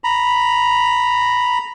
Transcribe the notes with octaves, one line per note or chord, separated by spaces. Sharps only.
A#5 B5